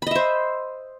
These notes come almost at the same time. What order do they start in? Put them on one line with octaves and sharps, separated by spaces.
B5 D#5 E5 C5